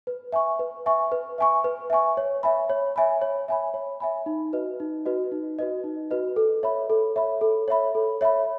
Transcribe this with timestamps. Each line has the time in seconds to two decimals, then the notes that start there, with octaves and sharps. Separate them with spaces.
0.07 B4
0.32 E5 G#5 C#6
0.59 B4
0.86 E5 G#5 C#6
1.12 B4
1.38 E5 G#5 C#6
1.64 B4
1.90 E5 G#5 C#6
2.17 C#5
2.43 E5 G#5 B5
2.70 C#5
2.96 E5 G#5 B5
3.22 C#5
3.48 E5 G#5 B5
3.74 C#5
4.00 E5 G#5 B5
4.26 D#4
4.53 F#4 B4 D#5
4.80 D#4
5.05 F#4 B4 D#5
5.32 D#4
5.59 F#4 B4 D#5
5.84 D#4
6.11 F#4 B4 D#5
6.36 A4
6.63 C#5 E5 B5
6.90 A4
7.16 C#5 E5 B5
7.41 A4
7.68 C#5 E5 B5
7.95 A4
8.21 C#5 E5 B5